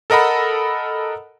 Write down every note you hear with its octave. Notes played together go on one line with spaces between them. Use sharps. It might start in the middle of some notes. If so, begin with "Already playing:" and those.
A4 A#4 D#5 F#5 B5